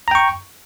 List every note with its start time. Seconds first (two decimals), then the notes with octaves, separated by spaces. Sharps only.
0.08 A#5
0.11 G5
0.15 C#6